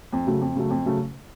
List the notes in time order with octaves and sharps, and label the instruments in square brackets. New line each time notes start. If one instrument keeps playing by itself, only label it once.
[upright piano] F2
C#3 F#3 A3
F2
C#3 F#3 A3
F2
C#3 F#3 A3